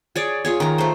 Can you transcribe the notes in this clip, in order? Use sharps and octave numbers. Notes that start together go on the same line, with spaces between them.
G#4 C#5 D5
F4 G#4 C#5
D#3 A#5
A3 C5